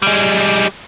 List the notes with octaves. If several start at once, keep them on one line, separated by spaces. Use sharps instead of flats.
G3 G#3